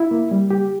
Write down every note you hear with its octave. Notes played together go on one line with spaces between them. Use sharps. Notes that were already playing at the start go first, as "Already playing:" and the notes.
Already playing: E4
A#3
G3
G4